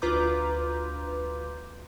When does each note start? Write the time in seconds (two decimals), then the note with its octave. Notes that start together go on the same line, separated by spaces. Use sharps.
0.02 D2 F4 B4 A#5 D6 G6